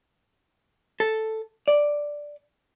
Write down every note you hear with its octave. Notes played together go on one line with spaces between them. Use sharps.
A4
D5